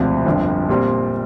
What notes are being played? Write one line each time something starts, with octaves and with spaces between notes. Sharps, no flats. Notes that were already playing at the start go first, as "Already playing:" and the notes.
Already playing: E1 D2 C3 F3 C4
G1 F2 D3 F3
A#2 G3 C4